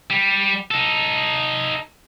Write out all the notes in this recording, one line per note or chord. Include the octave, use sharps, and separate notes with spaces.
G3
D#4 A4